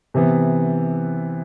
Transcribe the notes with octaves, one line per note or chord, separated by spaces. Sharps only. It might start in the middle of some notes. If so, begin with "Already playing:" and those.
C3 E3 B3